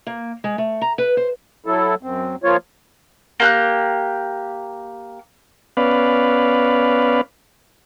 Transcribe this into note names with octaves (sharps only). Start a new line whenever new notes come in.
A#3
G#3
A3
A#5
B4
C5
F#3 E4 A4
F#2 C4
F3 A#3 F4 C#5
A#3 G4 F#6
B3 C#4 B4 D5 F5